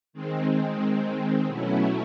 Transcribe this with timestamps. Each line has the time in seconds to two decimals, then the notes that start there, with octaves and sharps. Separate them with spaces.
0.13 D#3 G#3 C4
1.46 B2 F#3 A3 C#4 E4